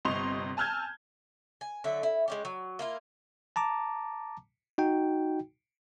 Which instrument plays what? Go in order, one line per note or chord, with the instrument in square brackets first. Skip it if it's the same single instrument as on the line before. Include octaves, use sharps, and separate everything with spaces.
[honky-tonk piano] G1 C3 D#5 C6 C#6 F7
G#5 A5 E6 F6 G6 G#6
[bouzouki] G#5
D3 F#3 E5
E4
G#3 C#4 G4
F#3
A#3 E4 F4
[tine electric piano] A5 A#5 D6
D#4 F#4 G5